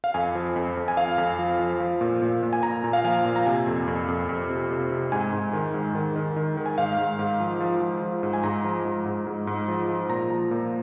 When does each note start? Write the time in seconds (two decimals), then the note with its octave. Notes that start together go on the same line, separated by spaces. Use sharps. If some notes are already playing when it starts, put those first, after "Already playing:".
0.04 F5
0.14 F2 G#5
0.35 F3
0.56 F2
0.77 F2
0.88 G#5
0.97 F2 F5
1.18 F2
1.39 F3
1.59 F3
1.80 F3
2.01 A#2
2.22 A#2
2.43 A#2
2.53 G#5
2.63 A#2 A#5
2.84 A#2
2.93 F5
3.04 F3 G#5
3.25 A#2
3.36 A#5
3.46 C3 G#5
3.67 F2
3.88 F2
4.08 F2
4.29 F2
4.50 C3
4.71 C3
4.91 C3
5.12 G#2 G#5
5.33 G#2
5.53 D#3
5.74 G#2
5.95 D#3
6.16 D#3
6.36 D#3
6.57 D#3
6.66 G#5
6.78 G#2 F5
6.98 G#2
7.19 G#2
7.40 F3
7.60 F3
7.82 F3
8.02 F3
8.23 G#2
8.33 G#5
8.43 G#2 A#5
8.64 F3
8.85 G#2
9.06 G#2
9.27 G#2
9.47 G#2
9.68 F3
9.89 F3
10.09 A#2 A#5
10.30 F3
10.51 A#2